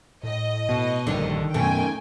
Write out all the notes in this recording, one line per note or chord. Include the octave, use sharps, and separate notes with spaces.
A2 D#5
B2
A#1 G2 D3 D#3
F#2 B2 A3 C#4 G5 G#5